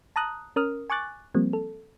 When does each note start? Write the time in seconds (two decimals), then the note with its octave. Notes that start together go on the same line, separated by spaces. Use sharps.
0.16 A5 A#5 D#6 F#6
0.56 C#4 A#4 D#6 F6
0.90 G#5 C#6 D6 F#6 A6
1.34 F3 G3 A#3 C4
1.53 A4